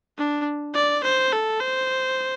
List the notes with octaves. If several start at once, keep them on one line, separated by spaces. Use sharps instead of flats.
D4
D5
C5
A4
C5